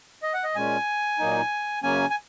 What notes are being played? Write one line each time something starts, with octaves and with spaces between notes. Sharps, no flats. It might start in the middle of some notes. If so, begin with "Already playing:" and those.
D#5
F#5
D#5
A#2 G#3 C#4 G#5
A#2 F#3 A#3 D#4
F#2 C#3 F#3 A#3 C#4 G#5
G#5